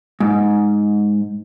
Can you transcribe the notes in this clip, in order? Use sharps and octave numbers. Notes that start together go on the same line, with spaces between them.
G#2